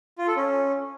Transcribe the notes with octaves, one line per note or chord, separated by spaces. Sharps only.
F4
A4
C#4